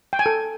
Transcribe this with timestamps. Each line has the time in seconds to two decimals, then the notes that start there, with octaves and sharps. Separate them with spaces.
0.13 G5
0.19 G#5
0.26 A4